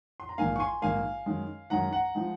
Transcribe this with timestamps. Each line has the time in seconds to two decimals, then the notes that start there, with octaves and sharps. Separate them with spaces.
0.20 C6
0.29 A#5
0.38 A#1 G#2 D#3 A#3 F5 G#5
0.56 C#6
0.60 G#5 C6
0.82 A#1 G#2 D#3 A#3 F5 G#5
1.26 F#2 D#3 G#3
1.70 F#2 D#3 G#3 F#5 A#5
1.92 F#5 A#5
2.15 F3 G#3 D#4